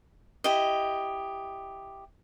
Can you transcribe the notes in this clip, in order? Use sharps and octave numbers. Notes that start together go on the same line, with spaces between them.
E4 G4 D#5